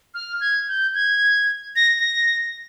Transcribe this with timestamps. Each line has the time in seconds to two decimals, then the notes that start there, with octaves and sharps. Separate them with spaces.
0.14 F6
0.41 G#6
0.68 G6
0.95 G#6
1.76 A#6
1.99 A#6